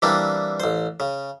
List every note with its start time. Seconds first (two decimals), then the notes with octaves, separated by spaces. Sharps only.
0.02 E3 G3 A#3 C4 D4
0.60 A1 C5
1.00 C#3